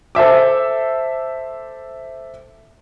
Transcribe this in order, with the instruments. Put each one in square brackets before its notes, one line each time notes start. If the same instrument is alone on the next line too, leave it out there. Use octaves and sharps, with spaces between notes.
[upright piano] A4 C5 E5 D6